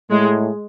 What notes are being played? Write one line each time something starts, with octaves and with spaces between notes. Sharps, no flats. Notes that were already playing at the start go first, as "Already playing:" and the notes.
A2 G#3